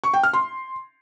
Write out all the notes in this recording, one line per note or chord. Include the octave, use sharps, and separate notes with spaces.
C#6
G5
F6
C6